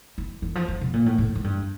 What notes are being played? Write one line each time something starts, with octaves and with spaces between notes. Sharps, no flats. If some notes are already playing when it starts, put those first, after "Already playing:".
E3
E3
F3
F3
B2
A#2
A2
A2
G#2
G2